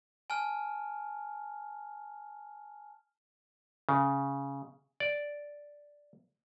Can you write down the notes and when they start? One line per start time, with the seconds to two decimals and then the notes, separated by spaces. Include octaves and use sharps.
0.30 G#5 A5 F6
3.89 C#3
5.00 D5